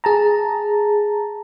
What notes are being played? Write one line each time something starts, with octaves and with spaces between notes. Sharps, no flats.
G#4 A5 A#5